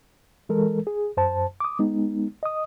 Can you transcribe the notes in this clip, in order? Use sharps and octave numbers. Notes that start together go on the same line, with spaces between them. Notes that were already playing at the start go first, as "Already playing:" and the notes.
E3 G#3 A4 A#4
G#4
F#2 C5 A5
D6 D#6
G#3 B3 D#4
D#5 D#6